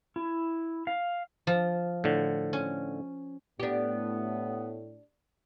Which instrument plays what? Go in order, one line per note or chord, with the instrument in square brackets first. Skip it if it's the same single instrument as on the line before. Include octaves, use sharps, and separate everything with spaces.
[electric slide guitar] E4
F5
[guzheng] F3
[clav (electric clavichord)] A2 D3
[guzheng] C#4
[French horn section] A2 [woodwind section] B3 [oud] D4 G4